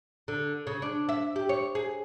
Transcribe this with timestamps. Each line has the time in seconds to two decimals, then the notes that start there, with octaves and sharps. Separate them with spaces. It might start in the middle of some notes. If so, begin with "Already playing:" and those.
0.28 D3
0.67 C#3
0.82 D4
1.09 E5
1.36 G4
1.49 C#5
1.75 G#4